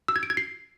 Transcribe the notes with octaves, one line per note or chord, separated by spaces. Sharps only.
E6
G#6
D7
G#6
C7